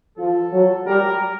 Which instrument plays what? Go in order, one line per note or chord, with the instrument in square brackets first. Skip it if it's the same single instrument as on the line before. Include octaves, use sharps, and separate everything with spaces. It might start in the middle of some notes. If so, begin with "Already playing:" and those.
[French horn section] F3 [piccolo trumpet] A4
[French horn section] F#3
[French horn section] G3 [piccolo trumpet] A#4